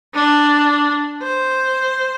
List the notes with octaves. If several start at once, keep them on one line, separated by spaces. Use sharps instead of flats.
D4
C5